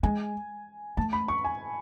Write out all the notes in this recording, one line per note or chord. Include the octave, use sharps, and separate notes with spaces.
G#3 G#5
A3 A5
B5
C#6
G#5